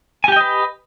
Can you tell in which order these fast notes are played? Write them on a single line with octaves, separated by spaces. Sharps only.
G#5 G4 G5 D#5 B4